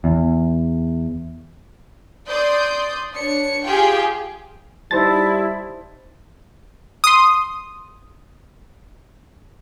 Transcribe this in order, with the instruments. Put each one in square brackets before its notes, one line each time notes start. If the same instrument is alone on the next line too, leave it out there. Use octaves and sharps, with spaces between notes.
[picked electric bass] E2
[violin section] D5 C6 D#6 G6
D4 C#5 C#7
F4 G4 G#4 F5 G5 G#5
[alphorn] G3 [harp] D#4 C5 A5 [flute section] E4 [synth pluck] A6
[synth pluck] C6 D#6